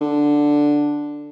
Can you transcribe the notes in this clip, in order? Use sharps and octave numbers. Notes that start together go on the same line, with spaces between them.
D3